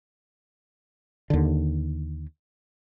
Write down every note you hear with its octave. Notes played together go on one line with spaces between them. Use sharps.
D#2 D3